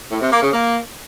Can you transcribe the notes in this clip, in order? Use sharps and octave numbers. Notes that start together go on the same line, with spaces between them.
A2
C3
A#3
C#3
A#3